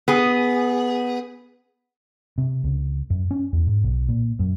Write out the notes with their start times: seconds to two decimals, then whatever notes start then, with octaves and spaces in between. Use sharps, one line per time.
0.08 B3 G#4
2.38 C3
2.64 C#2
3.10 F#2
3.31 C#4
3.53 E2
3.67 G#2
3.83 B1
4.09 A#2
4.39 F#2